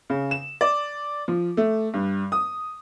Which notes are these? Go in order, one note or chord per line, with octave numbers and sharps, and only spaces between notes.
C#3
E7
D5
F3
A3
G2
D#6